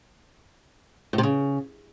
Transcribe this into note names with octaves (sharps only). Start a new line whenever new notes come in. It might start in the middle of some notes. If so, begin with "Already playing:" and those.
A2
C3
C#3